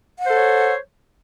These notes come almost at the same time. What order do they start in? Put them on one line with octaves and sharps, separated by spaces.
F#5 C5 A4 C#5